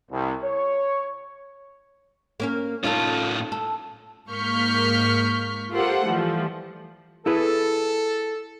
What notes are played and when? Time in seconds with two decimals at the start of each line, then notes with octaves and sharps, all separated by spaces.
0.12 C2
0.43 C#5
2.40 A#3 C#4 A#4
2.84 A2 C#4 D#4 F4 A4
3.52 A4
4.30 G#2 A#3 C#6 F6 G6 B6
5.72 F4 G4 A4 A#4 C5 F#5
6.05 E3 F3 G3 A3
7.26 E4 G#4 A4 B4